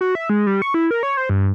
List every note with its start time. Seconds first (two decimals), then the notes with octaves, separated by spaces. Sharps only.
0.01 F#4
0.15 E5
0.30 G#3
0.47 G3
0.62 C#6
0.74 E4
0.91 A#4
1.03 C#5
1.17 C5
1.29 G2